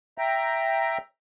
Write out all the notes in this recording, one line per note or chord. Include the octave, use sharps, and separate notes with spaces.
E5 G5 A#5